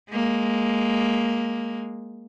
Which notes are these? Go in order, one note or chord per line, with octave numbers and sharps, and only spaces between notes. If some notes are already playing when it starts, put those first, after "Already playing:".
G#3 A#3